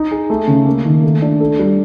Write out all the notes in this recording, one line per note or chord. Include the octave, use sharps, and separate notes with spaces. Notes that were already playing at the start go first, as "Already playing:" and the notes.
Already playing: D#4
G#4
A3
C#3
A#3
D#3
A3
D4
A4
G3